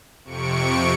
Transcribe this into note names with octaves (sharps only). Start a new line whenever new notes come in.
F2 C3 C#6 C#7 D7